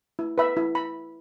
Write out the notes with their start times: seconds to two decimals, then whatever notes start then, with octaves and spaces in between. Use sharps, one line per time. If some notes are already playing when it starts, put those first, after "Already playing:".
0.19 E4
0.38 B4 E5 B5
0.57 E4
0.75 B5